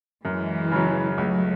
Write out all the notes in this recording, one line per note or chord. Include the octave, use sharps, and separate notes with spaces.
F#2 E3 G#3
C#3 F#3
C#2 F#3 A3